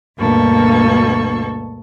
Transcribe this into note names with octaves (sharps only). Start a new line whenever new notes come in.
D2 G2 B2 A#3 A4 C#6